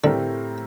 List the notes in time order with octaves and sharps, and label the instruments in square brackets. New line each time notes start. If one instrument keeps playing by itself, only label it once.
[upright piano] A2 A3 C4 G4 A#4 [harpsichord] D3